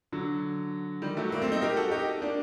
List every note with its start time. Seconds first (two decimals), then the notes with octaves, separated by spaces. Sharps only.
0.12 D3 F#3
1.02 D#3 G3
1.17 F#3 A3
1.32 G3 A#3
1.42 A3 C4
1.52 C4 D#4
1.61 G4 A#4
1.77 F#4 A4
1.92 D#4 G4
2.22 A#3 D4